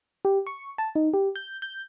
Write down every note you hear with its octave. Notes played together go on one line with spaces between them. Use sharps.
G4
C#6
A5
D#4
G4
G6
G6